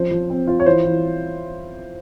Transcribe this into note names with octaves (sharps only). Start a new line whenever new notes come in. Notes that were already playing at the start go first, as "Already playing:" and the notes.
Already playing: F3 C#4 C5
F3
C4
F4
C#5
E3 C5
E3